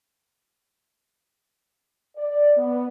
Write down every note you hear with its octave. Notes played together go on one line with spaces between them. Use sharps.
D5
B3